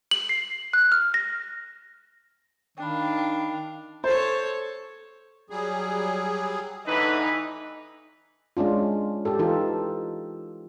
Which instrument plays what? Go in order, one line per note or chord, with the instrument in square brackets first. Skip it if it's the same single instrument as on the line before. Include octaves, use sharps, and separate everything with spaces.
[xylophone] F#7
C7
F#6
F6
A#6
[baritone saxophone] D#3 [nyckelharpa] D4 F5 [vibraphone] G5 B5
[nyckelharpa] A4 C#5 [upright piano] C5
[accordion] F#3 G3 G#4
[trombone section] A2 D3 E3 [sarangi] D#4 [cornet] B4
[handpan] G#3 C#4 D4 F4
G4 A4
E3 D#4 F4 A4